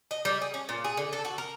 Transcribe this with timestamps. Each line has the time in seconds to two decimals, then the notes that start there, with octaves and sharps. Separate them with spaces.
0.11 D#5
0.25 G3
0.42 G#4
0.54 C#4
0.69 A#2
0.84 G#4
0.97 D3
1.13 A4
1.25 F#4
1.38 A#4